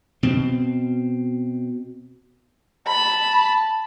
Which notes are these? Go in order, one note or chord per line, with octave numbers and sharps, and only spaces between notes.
B2 C4
A5 B5